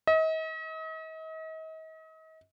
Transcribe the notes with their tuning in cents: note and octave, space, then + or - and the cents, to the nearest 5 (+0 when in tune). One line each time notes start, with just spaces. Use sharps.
D#5 +40